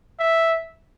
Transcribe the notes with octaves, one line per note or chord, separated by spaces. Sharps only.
E5